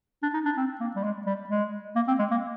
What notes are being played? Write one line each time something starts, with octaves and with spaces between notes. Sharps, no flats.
D4
D#4
D4
C4
A#3
G3
G#3
G3
G#3
A#3
C4
G#3
A#3